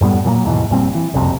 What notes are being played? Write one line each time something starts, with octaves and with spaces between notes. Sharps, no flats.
F#2 A2 G3 B3
A#2 F#3 G#3 A#3
D#2 G#2 B2 E3
F#1 A#2 G3 C4
E3
F#1 C2 F2 C3